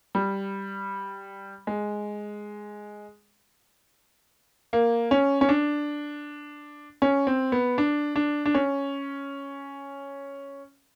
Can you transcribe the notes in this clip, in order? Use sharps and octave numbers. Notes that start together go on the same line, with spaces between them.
G3
G#3
A#3
C#4
C#4
D4
C#4
C4
B3
D4
D4
D4
C#4